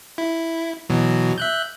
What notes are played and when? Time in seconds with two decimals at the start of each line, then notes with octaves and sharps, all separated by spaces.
0.18 E4
0.89 B2 E3 F#3
1.38 E5 F#6 G6